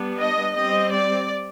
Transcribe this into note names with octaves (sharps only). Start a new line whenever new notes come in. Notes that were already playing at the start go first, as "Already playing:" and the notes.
Already playing: G3 B3 D4
D#5
G3 C4 D#5
D5